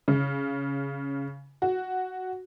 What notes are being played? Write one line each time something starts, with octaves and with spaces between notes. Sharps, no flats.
C#3
F#4